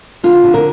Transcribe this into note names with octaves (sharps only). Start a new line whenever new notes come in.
D3 F4
D3
A#4